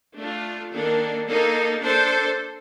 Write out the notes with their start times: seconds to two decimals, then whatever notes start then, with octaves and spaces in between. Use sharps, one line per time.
0.17 A3 D4 F4
0.73 D#3 A#3 D4 A4
1.27 A#3 D#4 A4
1.82 D4 A4 C5